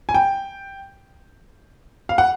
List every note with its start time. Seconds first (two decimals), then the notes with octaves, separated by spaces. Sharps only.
0.09 G#5
0.14 G5
2.09 F5
2.18 F#5